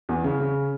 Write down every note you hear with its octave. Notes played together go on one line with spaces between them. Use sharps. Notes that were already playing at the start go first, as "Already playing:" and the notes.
E2
C#3
C#3